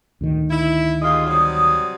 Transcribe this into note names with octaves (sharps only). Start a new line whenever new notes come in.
D2 A2 D#3
E4
D#2 G#3 F4 D#6
C3 F#3 G3